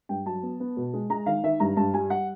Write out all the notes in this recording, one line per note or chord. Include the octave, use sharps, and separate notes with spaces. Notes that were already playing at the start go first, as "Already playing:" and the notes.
G2 G5
F#3 A5
B3
B3
B2
G#3
G#3 A#5
D#3 F5
D#3 E5
G2 A#5
G2 A5
G3 G#5
F#5